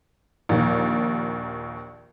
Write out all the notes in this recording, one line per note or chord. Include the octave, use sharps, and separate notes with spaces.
A#1 D#2